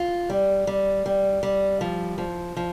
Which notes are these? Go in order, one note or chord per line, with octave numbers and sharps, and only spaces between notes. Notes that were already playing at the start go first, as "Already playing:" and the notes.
Already playing: F4
G3
G3
G3
G3
F3
F3
F3